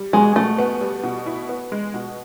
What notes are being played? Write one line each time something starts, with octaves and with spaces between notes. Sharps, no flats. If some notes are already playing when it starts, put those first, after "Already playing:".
Already playing: G3
B2 G#3
B2 A3
B3
G3
B2
E4
B3
G#3
B2